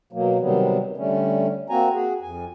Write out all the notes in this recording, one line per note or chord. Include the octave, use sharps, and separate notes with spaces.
B2 F#3 A#3
C3 D#3 F#3 G3 B3
D3 G3 A3 C#4
A#3 C4 F#4 G#5 A#5
F#4 G#4
F2 G#5